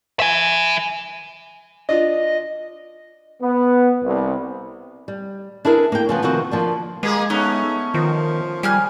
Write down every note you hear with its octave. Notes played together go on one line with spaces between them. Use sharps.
E5 G#5
D4 F4 D#5
B3
C2
G3
D4 E4 G#4 A#4 B4
A#3 G5
C#3 F3 B3
C3 D#3 F3 F#4 B4
F3 A#3 D4
G#3 A#3 G#4
A3 B3 C#4 D#4
D#3 F3
G3 G#4 G#5 F6